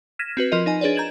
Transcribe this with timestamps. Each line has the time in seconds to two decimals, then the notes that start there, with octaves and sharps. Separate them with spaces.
0.19 F6 G#6 A#6 B6 D#7 E7
0.37 C4 F#4 B4
0.51 F3 F4 A#4 D#5 D#7
0.66 D#4 D#5 G#5
0.81 D4 G#4 B4 C#5 D5
0.96 A#5 G6 G#6 E7 F#7